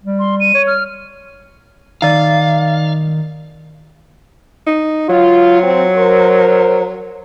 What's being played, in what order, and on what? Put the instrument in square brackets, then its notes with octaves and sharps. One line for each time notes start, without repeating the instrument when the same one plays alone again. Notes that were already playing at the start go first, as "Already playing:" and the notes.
[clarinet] G3
[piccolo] C6
D#7
[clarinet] C#5
[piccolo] F6
[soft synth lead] D#3 [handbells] D#4 D5 [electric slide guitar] F5
[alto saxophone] D#4
[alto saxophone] F#3 [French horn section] F4
[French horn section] C4
A#4 C5